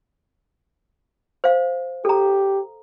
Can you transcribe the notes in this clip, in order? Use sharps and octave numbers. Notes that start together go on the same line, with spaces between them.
C5 F5
G4 A4 A#5